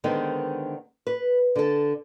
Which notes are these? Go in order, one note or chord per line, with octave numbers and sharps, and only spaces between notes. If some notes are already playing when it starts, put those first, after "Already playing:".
D3 D#3 G#3 B3 C4 D#4
B4
D3 A4